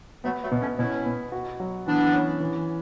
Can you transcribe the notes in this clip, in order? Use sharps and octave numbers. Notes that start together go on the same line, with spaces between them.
F#3 A3 B3
F#3 A3
B2
A3 C#4
B2 C#4 E4
B2
F#4
F#3
E3 B3 D4
C#4
E3